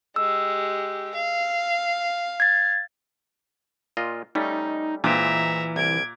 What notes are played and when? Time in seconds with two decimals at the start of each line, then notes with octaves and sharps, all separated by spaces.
0.16 G#3 G4 E6
1.14 F5
2.40 G#6 A6
3.97 A#2 F4 D#5
4.35 G3 A3 C#4 D#4
5.04 A#2 E3 G#3 C4 E5 A#5
5.76 C2 G#6 D7